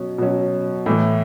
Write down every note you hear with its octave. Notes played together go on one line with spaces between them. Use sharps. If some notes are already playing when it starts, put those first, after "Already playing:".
Already playing: B2 F#3 C#4
B2 F#3 C#4
A2 E3 A3